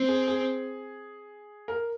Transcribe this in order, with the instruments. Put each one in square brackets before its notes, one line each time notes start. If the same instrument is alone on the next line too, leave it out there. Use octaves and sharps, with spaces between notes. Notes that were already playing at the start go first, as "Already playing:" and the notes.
Already playing: [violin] C4
[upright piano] G#4
G#4
A#4